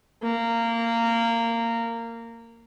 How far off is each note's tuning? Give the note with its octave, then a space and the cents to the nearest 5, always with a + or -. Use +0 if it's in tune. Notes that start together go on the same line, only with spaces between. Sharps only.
A#3 -20